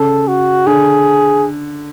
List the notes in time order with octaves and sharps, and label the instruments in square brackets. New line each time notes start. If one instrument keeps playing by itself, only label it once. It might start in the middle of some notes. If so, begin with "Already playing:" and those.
Already playing: [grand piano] C#3 [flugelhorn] A4
[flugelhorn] F#4
[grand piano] D3 [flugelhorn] G#4